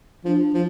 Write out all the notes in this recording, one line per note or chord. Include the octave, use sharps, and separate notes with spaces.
F3 D4
F3